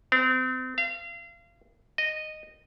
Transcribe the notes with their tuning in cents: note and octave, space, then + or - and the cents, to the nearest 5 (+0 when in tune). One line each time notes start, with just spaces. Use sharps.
C4 -35
F5 -30
D#5 -10